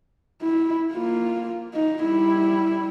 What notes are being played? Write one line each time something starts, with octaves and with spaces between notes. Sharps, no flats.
E4
A#3 F4
D#4
G3 E4